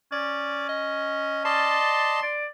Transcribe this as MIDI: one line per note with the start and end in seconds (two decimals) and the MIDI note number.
0.12 1.79 61
0.12 0.68 74
0.69 1.44 75
1.45 2.20 74
1.45 2.20 75
1.45 2.20 81
1.45 2.38 84
2.23 2.46 74